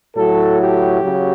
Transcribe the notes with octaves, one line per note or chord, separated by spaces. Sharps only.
A2 F#3 A4
G4
C#3 F#3